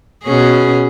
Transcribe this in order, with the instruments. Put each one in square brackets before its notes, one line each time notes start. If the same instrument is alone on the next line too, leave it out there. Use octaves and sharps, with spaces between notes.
[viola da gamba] B2 C#4 G#4